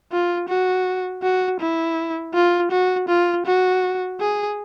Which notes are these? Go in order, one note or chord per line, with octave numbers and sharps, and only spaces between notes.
F4
F#4
F#4
E4
F4
F#4
F4
F#4
G#4